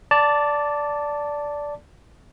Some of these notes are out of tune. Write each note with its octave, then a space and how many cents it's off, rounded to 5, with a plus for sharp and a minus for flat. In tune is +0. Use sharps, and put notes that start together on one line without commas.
D5 -10 A5 +10